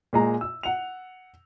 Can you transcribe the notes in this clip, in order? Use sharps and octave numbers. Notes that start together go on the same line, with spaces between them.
A#2 G#3 A#5
E6
F#5 F7